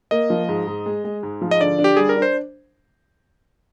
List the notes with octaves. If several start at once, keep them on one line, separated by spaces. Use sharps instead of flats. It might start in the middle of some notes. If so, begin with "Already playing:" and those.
A#3 D#5
F3
G#2
G#2
G#3
G#3
G#2
F3
D#5
D3 D5
D4
G4
G3 G#4
A#4
D4
C5